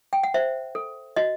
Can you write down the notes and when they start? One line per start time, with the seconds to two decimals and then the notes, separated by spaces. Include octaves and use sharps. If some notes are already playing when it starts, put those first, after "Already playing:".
0.13 G5
0.23 F#5
0.34 C5 E5
0.75 A4
1.16 F#4 D#5